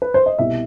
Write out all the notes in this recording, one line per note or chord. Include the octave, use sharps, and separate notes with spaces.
B4
C5
D#5
C2 B2 G3 E5